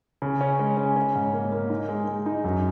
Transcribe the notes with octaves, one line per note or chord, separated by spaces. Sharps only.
C#3
C#4
G#3
C#4
C#4
G#2
A#3
A#3
D#4
G#3
G#3
D#4
F#2